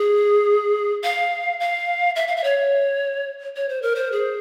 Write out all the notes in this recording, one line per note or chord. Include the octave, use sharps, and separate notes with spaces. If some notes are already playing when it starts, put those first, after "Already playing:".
Already playing: G#4
F5
F5
E5
F5
E5
C#5
C#5
C5
A#4
C5
G#4